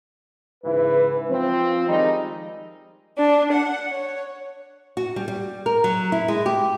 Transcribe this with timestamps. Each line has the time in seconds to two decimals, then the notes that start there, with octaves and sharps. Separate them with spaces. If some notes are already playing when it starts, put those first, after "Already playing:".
0.64 G#2 C#3 E3 E4 B4
1.30 F3 C4
1.87 D#3 F3 G3 G#3 C4 D#4
3.18 D4
3.52 F#5
3.90 C#5
4.97 F#4
5.16 G3
5.28 G3
5.66 A#4
5.84 F#3
6.12 E4
6.28 G#3
6.46 G4